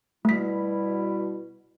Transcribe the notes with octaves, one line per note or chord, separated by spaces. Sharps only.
B2 G3 A3 E4 B6